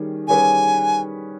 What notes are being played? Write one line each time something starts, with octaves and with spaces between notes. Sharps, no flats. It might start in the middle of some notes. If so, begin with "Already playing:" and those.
Already playing: D#3 G3 C#4 G#4
D#3 G3 C#4 G#4 B4 G#5